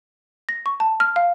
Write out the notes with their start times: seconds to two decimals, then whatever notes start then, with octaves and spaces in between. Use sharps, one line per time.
0.49 A#6
0.66 C#6
0.80 A5
1.00 F6
1.16 F5